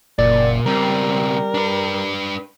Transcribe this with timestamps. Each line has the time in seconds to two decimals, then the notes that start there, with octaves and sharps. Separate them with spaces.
0.18 F#1 A#2 D5
0.66 C#2 G3 C4 A#4
1.54 D4 B4